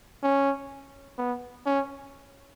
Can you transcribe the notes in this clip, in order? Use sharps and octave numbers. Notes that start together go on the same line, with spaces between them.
C#4
B3
C#4